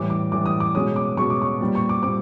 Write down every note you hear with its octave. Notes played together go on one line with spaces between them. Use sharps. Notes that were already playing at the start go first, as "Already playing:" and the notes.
Already playing: A2 E3 G3 D6
D6
A2 E3 G3 D6
D#6
D6
B2 G#3 C#4 D#6
D6
B2 G#3 C#4 C#6
D6
C#6
A#2 G3 C4
C#6
D6
A#2 G3 C4 D6